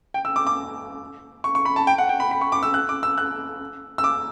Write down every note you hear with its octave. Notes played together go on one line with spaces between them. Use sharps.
G5
E6
D6
D6
C#6
C#6
B5
A5
G5
F#5
G5
B5
B5
C#6
D6
E6
F#6
D6
E6
F#6
E6
D6